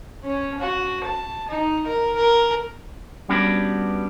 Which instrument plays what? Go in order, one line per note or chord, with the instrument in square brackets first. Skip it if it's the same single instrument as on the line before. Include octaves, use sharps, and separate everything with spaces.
[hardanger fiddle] C#4
F#4
A5
D#4
A#4
A#4
[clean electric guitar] G3 B3 C#4 D4 F#4 B4